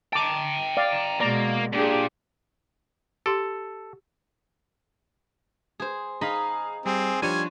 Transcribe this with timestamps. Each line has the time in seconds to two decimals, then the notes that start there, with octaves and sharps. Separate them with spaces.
0.13 G5 A5 A#5 D6
0.77 D5 F5
1.20 B2 G#3 A#3 D5 A#5
1.73 A#2 D4 G4 G#4
3.26 G4 A4 C6
5.80 G#4 C5
6.21 D#4 G#4 D#5 F5 B5
6.86 G3 C4 G#4
7.22 F3 G3 D4 C5 C#5 G#5 D#7